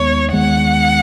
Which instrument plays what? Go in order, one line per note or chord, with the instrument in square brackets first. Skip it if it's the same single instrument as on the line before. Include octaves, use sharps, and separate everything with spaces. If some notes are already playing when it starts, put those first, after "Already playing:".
Already playing: [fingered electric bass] D#2 D#3 G#3 B3 [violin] C#5
[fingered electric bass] D#2 D#3 G#3 B3 [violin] F#5